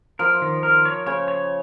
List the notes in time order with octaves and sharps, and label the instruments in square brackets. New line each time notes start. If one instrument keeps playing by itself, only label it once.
[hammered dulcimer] F3 [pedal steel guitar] A#4
[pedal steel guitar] D#3
A#4
C#5
[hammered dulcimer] C#3 [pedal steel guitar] C#5
[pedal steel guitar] C#5